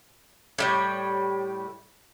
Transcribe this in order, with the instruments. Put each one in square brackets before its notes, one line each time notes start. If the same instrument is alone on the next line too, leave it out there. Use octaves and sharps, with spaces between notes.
[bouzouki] A2 G3 C#5